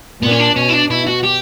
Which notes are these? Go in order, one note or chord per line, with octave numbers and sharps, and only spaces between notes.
A#2 B3
C#4
D4
B2 C#4
E4
D4
B2 E4
F#4
G4